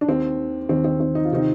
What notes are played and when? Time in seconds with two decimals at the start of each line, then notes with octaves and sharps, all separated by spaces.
0.01 D4
0.08 D#2 D#3 C4
0.69 D#2 D#3 C4
0.84 C4
1.00 C4
1.15 D#4
1.25 F4
1.32 C3 D#3 C4 D#4